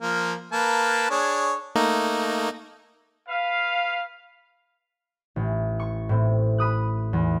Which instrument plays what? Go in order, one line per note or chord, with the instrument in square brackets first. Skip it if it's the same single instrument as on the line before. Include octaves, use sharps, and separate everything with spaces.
[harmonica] F3 A#3
A#3 B4 A5
D4 G#4 C#5
[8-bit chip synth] A3 A#3 D#4
[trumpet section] B4 F5
[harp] A1
C#6
A2 C4
B5 D#6 F#6
E2